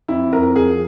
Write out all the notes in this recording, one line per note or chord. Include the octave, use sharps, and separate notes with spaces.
F2 E4
F2 A#4
F3 G#4